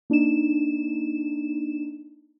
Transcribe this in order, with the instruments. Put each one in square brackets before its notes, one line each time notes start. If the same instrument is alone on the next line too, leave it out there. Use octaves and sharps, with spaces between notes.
[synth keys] A#3 D4 D#4 E7